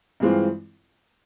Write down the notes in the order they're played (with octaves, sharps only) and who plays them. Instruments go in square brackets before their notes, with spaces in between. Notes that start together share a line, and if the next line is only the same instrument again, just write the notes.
[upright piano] G2 E3 G#3 C4 F4